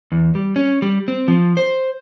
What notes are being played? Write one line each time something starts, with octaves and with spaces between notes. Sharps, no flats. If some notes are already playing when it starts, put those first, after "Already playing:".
E2
G3
C#4
G3
C4
F3
C5